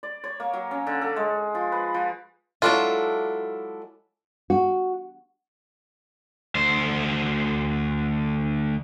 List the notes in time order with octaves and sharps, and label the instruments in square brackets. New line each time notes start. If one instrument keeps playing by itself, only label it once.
[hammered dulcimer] D5
C#5
A#3
F#3
C#4
D3
A4
G#3
F3
B4
F3
[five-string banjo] F#3 D4 F4 [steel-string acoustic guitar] G#3 E4 A4
[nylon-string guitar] F#4
[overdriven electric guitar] D2 C5